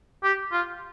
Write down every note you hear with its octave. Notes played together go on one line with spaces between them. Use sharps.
G4
F4